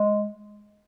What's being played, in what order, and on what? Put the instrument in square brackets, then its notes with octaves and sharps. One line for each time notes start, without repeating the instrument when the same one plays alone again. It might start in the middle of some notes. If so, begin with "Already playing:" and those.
Already playing: [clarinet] G#3